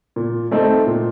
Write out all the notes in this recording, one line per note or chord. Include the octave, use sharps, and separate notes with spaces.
A#2
A3 C4 D#4 A4
A#2